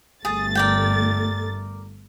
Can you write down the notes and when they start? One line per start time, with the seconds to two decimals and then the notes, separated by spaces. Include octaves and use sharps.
0.25 G1 A3 G#4 A6
0.55 A#4 D5 G5